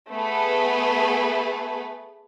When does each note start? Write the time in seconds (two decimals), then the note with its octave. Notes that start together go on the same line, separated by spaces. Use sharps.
0.11 A3 B3 G#4 B4